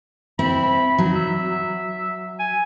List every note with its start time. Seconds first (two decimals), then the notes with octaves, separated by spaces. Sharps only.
0.39 C4 E4 B5
0.98 F#3 D#4
1.15 E5
2.40 G#5